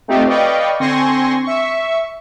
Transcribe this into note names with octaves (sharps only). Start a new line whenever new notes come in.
A3 C4 D#4 F4 G4
B4 D5 D#5 F5 G5 C#6
D3 C4 G#5 C6 C#6 A#6
E5 C#6